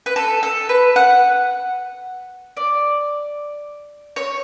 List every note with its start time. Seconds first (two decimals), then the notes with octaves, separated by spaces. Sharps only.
0.06 B4
0.16 A4
0.43 A4
0.69 B4
0.96 F#5
2.57 D5
4.16 C#5